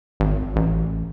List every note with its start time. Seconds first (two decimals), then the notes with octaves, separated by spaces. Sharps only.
0.20 G#1
0.56 A1